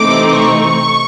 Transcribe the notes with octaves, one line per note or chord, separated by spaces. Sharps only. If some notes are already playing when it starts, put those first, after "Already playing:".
Already playing: C3 E3 A3 C4 D#4 D6
C#6